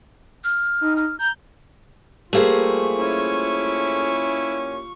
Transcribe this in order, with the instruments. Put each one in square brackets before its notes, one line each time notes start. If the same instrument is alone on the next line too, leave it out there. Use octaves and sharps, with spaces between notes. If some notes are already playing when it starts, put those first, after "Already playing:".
[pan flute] F6
[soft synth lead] D#4
[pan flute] F6
[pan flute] A#5 [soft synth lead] G6
[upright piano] G3 A#3 G4 [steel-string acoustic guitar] A3 G#4 C5 [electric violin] F4 C#6
[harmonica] C#4 E4